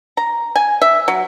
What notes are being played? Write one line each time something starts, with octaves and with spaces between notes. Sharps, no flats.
A#5
G#5
E5
F#3